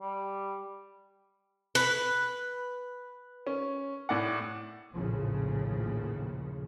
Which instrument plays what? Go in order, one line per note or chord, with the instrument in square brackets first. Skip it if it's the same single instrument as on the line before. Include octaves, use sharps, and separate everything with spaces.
[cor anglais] G3
[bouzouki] B4
[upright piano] C#4
A2 D5 F#5
[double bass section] A#1 D#2 A2 C#3 F3